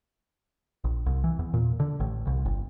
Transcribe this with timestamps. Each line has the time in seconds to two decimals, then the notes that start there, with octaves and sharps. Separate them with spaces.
0.84 A#1
1.06 C2
1.24 E3
1.39 E2
1.54 A#2
1.80 D3
2.00 A1
2.27 C2
2.45 G1